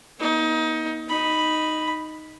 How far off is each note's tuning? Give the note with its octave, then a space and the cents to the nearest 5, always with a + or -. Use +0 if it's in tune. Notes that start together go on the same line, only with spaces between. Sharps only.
B3 -45 D#4 +25
D#4 +0 B5 +0